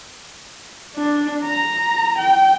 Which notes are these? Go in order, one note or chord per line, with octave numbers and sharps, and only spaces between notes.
D4
A#5
G5